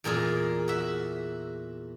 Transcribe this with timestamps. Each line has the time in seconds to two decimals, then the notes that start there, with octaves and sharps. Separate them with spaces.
0.04 E2 A#2 G#4 A#4
0.68 F#4 E5